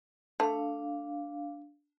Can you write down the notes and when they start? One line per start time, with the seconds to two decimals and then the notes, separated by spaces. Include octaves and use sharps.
0.40 A3 D4 F5